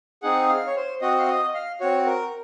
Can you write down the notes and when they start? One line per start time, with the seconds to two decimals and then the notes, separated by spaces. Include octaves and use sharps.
0.23 C4 D#4 G#4 F#5
0.49 F5
0.67 C#5
0.76 C5
1.01 C4 F#4 D#5
1.18 F5
1.28 D#5
1.54 F5
1.80 C4 F#4 C#5
2.06 A#4